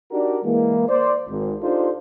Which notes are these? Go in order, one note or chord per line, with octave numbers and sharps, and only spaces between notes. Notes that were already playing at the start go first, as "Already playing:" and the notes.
D4 D#4 F#4 G4 A#4 D5
E3 G#3 A#3
C5 D5
G#1
D4 D#4 F4 G4 A4 C5